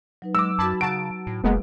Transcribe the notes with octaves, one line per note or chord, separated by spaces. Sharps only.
F#3 D#4 B4
F#3 G#3 D6 E6
F#2 F#4 A5 B5 G#6
C#3 F#4 A5 A#5 D7
A2
F1 G#3 A#3 B3